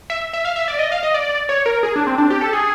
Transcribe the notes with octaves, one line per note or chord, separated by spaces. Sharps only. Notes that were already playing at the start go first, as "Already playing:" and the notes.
E5
E5
F5
E5
D5
D#5
F5
D#5
D5
C#5
A#4
G#4
D4
C4
D4
G4
A4
G#4